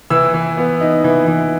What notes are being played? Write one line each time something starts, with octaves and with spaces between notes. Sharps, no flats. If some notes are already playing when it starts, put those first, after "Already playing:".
E3 E6
E3
B3
D#4
E3
E3